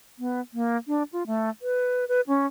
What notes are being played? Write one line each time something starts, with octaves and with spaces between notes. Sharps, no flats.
B3
A#3
D4
F4
A3
B4
B4
C#4